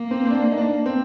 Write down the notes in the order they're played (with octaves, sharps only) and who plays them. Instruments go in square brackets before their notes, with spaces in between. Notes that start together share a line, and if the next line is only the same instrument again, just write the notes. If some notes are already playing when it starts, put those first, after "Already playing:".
Already playing: [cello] A#3
[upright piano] C4
C4
D4
D#4
D4
C4